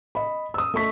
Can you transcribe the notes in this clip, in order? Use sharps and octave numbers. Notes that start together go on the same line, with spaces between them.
D#5 B5
D#6 E6
A3 D#5 C#6 B6